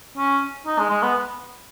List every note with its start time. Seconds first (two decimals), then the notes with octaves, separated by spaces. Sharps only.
0.18 C#4
0.66 D#4
0.78 G#3
0.90 G#3
1.02 B3